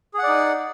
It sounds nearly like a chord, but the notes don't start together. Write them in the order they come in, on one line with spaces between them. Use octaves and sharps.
G#4 F#5 D5 D#4